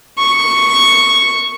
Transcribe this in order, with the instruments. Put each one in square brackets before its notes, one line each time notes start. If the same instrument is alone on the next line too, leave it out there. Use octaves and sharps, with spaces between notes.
[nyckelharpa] C#6